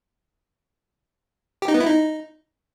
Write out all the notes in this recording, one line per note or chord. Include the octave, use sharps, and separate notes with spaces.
G4
D#4
B3
E4
D#4